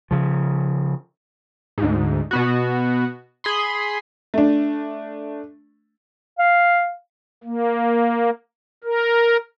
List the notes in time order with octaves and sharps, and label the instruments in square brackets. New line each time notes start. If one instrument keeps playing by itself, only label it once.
[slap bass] C#3 F3
[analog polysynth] D2 G#2
B2 B3 F#4
G#4 B5 C6
[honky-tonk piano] A3 D4
[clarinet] F5
[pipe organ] A#3
A#4